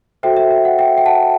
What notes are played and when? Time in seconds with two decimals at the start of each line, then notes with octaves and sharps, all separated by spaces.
0.23 F#4 A4 C5 E5 G5
0.37 E5
0.51 E5
0.65 F#5
0.79 E5 G5
0.98 G5
1.06 F#5 A5